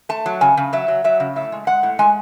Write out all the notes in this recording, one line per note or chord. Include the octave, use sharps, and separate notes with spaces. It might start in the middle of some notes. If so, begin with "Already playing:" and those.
A3 A5
F#3
C#3 G#5
C#3
F#3 E5
F#3
F#3 E5
C#3
A2 E5
G#3
G#3 F#5
A2
G#3 G#5